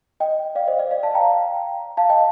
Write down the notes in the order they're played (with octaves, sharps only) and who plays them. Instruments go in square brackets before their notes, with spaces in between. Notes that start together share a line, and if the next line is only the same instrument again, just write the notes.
[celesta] D#5 G5
D5 F5
C5 D#5
D5 F5
D5 F5
F5 A5
G5 A#5
F5 A5
D#5 G5